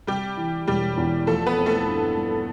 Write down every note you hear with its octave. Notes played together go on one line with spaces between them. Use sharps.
C3 G3 G4
E3
E1 G3 G4
E2
F3 A3 A4
B3 B4
C4
A3 A4
G2
G2